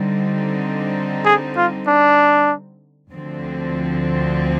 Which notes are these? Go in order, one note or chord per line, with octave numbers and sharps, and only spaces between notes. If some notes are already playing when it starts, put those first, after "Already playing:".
Already playing: D3 G3 C4 D#4
G#4
F4
D4
D2 D3 F3 C4